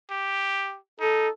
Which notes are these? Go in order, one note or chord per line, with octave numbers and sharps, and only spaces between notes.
G4
D#4 A4